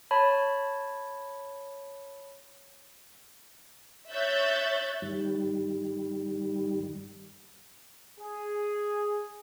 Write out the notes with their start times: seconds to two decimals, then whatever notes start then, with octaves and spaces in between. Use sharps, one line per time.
0.11 C#5 A5 B5
4.11 C#5 E5 F#6 G6 A6
5.02 G2 D#3 G3
8.19 G#4